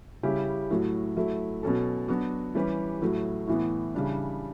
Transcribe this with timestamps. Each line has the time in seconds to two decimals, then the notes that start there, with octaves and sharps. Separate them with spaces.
0.23 C#3 G3 C#4 E4 G4
0.71 A2 F#3 A3
1.17 F#3 A3 E4
1.63 B2 F#3 C#4 F#4 A4
2.08 F#3 B3 D4 F#4
2.55 E3 G3 C#4 G4 B4
3.02 A2 F#3 A3
3.47 A2 E3 B3
3.94 C#3 E3 G3 D4